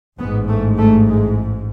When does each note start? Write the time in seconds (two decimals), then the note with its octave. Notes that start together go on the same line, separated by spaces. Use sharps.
0.18 A1 G#2 B3
0.48 A3
0.78 A3
1.07 G#3